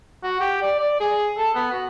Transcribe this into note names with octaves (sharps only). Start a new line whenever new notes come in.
F#4
G4
D5
D5
G#4
A4
B3
F#4